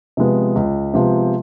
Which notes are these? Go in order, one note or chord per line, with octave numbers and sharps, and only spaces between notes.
C3 F3 G#3 B3
C#2
C3 F3 G#3 B3